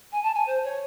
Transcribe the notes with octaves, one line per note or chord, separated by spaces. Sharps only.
G#5
A5
G#5
C5
C#5